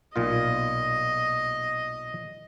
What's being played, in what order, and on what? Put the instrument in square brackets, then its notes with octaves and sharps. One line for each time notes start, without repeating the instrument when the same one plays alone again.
[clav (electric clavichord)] B1 A#2 F4 [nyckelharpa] D#5